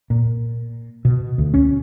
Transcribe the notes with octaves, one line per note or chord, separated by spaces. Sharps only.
A#2
B2
D2
C#4